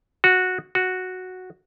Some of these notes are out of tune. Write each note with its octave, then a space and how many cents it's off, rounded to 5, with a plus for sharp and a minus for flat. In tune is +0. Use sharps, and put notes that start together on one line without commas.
F#4 -10
F#4 -5